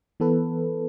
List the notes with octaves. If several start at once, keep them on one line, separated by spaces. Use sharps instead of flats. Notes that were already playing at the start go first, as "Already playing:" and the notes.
E3 B3 A4 B4